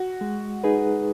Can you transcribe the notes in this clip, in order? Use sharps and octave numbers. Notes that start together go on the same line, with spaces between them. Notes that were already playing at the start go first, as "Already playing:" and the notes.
Already playing: F#4
G#3
D#4 G#4 B4